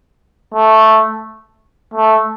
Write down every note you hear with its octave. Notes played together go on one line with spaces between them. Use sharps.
A3
A3